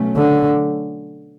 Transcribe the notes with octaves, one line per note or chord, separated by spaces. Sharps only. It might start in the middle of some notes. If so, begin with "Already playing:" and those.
Already playing: B2 F#3 A3 C#4
D3